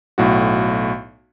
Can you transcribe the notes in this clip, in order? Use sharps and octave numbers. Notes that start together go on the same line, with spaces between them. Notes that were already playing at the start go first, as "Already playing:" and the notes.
B1 A2 F#4